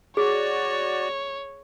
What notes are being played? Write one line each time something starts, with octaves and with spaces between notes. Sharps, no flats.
F#4 G#4 C#5 D5